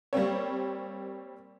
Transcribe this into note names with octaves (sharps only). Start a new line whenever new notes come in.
G3 A#3 C4 C#5